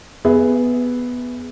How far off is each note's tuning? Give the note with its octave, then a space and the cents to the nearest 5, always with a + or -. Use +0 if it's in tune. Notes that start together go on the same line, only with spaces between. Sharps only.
B3 +0 G#4 +0 E5 -5